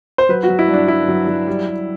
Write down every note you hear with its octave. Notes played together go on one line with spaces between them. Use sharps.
C5
F#3 B4
F#4
F#3
E4
G2
D4
G2 E4
F#3
F#3
G3
G3